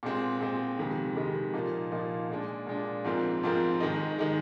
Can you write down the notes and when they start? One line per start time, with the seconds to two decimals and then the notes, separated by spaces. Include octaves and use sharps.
0.03 A#2 G#3 C4
0.41 A#2 G#3 C4
0.78 F2 C3 D#3 G#3
1.16 F2 C3 D#3 G#3
1.53 A#2 F3 A#3 D#4
1.91 A#2 F3 A#3 D#4
2.29 A#2 G#3 D4
2.67 A#2 G#3 D4
3.04 G#2 F3 C4 F4 A#4
3.43 G#2 F3 C4 F4 A#4
3.80 G#2 D#3 G#3 D#4
4.19 D#3 G#3 D#4